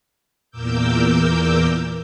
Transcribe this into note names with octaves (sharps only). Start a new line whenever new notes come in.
E2 A#2 A#4 D6 E6 G6